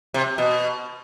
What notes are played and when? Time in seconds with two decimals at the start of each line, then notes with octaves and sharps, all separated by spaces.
0.14 C3
0.38 B2